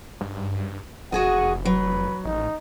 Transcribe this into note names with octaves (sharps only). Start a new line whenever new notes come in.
G2
F1 F#4 G#4 D#5 F#5
F#3 B4
A1 D#4